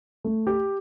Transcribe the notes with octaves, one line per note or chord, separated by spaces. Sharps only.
A3
G4